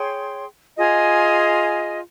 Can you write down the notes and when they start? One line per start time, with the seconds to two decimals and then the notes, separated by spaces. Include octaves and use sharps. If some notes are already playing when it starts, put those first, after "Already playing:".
Already playing: G#4 C#5 G5 C6
0.77 F4 G#4 D#5 G#5